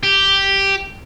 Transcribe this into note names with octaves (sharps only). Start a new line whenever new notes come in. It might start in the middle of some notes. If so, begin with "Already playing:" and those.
G4